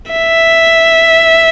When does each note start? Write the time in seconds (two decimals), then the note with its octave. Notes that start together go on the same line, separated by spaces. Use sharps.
0.11 E5